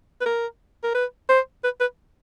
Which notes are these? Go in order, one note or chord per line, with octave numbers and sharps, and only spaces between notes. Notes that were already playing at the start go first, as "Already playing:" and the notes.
B4
A#4
A#4
B4
C5
B4
B4